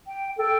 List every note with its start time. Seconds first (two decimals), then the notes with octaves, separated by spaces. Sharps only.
0.07 G5
0.38 A4 G5